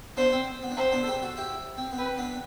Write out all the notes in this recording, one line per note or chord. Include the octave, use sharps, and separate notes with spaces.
B3 D4 C5
C4
B3
D4
C4 C5
B3 D4
A4
G4 B4
F#4 A4
E4 G4
C4
B3
C4 B4
B3 D4